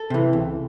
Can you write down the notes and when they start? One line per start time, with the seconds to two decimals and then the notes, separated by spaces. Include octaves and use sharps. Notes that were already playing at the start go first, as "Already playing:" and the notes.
Already playing: A4
0.10 C3 E3
0.33 C#2